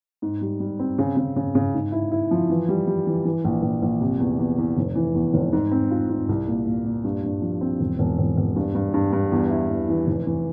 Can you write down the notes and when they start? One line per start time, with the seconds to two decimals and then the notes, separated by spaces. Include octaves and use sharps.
0.22 G#2
0.41 G3
0.60 G3
0.79 C4
0.98 C#3
1.17 C#3
1.36 C#3
1.55 C#3
1.74 G#2
1.92 E4
2.12 E4
2.31 F3
2.50 E3
2.68 G3
2.87 G3
3.07 E3
3.25 E3
3.44 A#1
3.63 A#1
3.82 A#1
4.01 C3
4.20 E2
4.39 E2
4.58 E2
4.77 F1
4.95 E3
5.15 E2
5.34 F1
5.53 G#2
5.71 C4
5.91 F4
6.10 G#2
6.29 C2
6.48 A#2
6.66 A#2
6.85 A#2
7.04 G2
7.23 G2
7.42 F3
7.61 C4
7.80 E1
7.99 E1
8.18 E1
8.37 E1
8.56 G2
8.75 G2
8.94 G2
9.13 G2
9.32 E2
9.51 E4
9.69 E2
9.89 E3
10.07 F1
10.27 E3